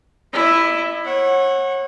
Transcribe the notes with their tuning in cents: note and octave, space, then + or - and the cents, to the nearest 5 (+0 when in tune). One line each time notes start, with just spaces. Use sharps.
E4 +5 D#5 -35
C#5 -30 F#5 +0